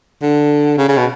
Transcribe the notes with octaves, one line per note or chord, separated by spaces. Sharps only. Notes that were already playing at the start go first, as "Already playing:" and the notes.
D3
C#3
C#3
B2